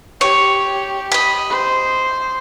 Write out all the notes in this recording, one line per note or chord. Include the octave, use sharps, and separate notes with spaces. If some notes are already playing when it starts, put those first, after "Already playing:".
G4 C#5
D#5 B5
C5